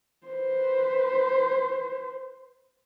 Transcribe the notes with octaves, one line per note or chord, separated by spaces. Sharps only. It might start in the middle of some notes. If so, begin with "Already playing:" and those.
B4 C5